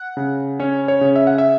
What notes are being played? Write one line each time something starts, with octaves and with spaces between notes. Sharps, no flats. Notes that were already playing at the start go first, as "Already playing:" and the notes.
Already playing: F#5
C#3
C#4 C#5
C#5
C#3
E5
F#5
E5